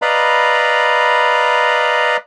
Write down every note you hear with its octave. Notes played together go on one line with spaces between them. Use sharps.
B4 D5 D#5 F5 A#5 B5